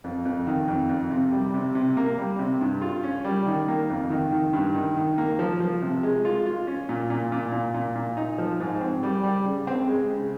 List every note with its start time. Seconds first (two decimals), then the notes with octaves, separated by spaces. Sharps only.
0.04 F2
0.25 F2
0.47 D#3
0.68 F2
0.89 F2
1.10 C3
1.33 G3
1.54 C3
1.75 C3
1.97 A#3
2.18 G3
2.39 C3
2.61 G2
2.82 F4
3.03 C#4
3.24 G3
3.47 D#3
3.68 A#3
3.90 F2
4.10 D#3
4.32 D#3
4.53 G2
4.74 D#3
4.97 D#3
5.18 A#3
5.39 F3
5.60 F3
5.82 C3
6.03 G#3
6.25 F4
6.46 F4
6.67 C#4
6.89 A#2
7.10 A#2
7.32 A#2
7.52 A#2
7.74 A#2
7.95 A#2
8.17 D#4
8.38 F3
8.60 G#2
8.81 C4
9.03 G3
9.23 G3
9.46 C#3
9.67 C4
9.88 G#3
10.10 C#3